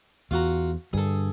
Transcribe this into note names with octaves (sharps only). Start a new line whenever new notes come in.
E2 F4 F#4 A#5
G2 D3 G#4 A4